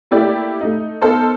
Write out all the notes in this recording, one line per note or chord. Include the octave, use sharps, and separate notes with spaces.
A3 A#3 E4 G4 D5
A3 D#4
B3 D#4 A4 A#4 C5 A5